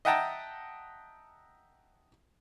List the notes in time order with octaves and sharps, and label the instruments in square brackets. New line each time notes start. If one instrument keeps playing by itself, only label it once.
[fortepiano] D#5 E5 F#5 G5 A5 A#5